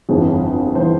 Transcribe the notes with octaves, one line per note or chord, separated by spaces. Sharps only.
G1 F2 E3 G#4
E3 C5